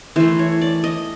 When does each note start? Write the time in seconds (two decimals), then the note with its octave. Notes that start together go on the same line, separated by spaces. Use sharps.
0.16 E3 A3 C5
0.39 C#5
0.61 D5
0.84 D#5